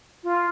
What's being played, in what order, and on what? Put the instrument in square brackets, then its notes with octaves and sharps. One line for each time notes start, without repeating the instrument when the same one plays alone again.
[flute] F4